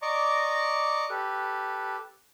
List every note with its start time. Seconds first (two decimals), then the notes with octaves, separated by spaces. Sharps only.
0.02 D5 D#5 A#5 C#6 D6
1.10 G4 A4 B4